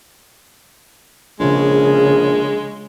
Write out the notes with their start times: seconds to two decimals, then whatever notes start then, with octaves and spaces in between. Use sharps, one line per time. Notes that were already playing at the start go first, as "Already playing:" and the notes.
1.40 A#1 C#3 G#3